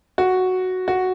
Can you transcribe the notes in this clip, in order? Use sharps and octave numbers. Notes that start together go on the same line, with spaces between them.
F#4
F#4